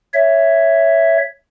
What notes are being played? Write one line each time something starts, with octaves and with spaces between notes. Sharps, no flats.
C#5 E5